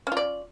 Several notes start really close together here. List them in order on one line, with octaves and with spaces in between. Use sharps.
C#4 F4 D5